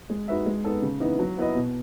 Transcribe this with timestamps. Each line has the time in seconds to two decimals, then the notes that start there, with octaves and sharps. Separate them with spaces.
0.10 G#3
0.28 D#4 F#4 B4 E5
0.46 G#3
0.64 B3 D#4 A4
0.82 C#3
1.00 E3 B3 D#4
1.19 F#3
1.37 B3 E4 B4 D#5
1.55 B2